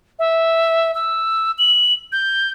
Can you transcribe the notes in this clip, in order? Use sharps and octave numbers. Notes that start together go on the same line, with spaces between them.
E5
E6
F#7
G6